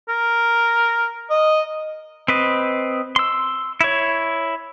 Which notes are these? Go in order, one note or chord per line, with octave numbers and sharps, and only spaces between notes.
A#4
D#5
C4 B4 D#5
C6 E6
E4 C#5